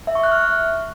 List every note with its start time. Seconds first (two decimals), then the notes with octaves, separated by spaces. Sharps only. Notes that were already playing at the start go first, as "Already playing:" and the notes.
0.07 E5
0.15 C#6
0.23 F#6
0.32 F6